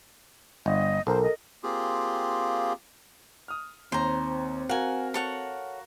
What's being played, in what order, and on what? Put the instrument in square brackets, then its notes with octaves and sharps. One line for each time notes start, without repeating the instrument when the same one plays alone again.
[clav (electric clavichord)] G1 [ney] D#5
[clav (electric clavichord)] B1 [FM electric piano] A4 A#4 [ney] C5
[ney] D#5
[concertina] A#3 C4 F4 G4 G#4
[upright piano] D#6 F6
[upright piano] D#2 [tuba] C4 [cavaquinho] C5 A#5
[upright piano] F#4 A#4 F5 [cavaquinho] F#5 G#5
[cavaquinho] A4 C#5 F#5